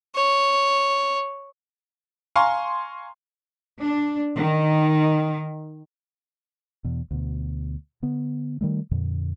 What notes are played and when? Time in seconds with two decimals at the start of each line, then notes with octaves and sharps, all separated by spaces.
0.15 C#5
2.36 F5 G#5 A#5 C6 C#6
3.80 D4
4.36 D#3
6.84 E2 B2
7.11 D2 B2
8.03 D3 B3
8.61 D#3 G3 A3
8.91 F2 A#2 D3